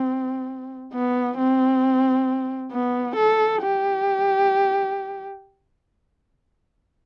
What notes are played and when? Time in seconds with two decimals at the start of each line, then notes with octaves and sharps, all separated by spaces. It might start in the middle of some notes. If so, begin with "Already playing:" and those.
Already playing: C4
0.93 B3
1.37 C4
2.72 B3
3.16 A4
3.61 G4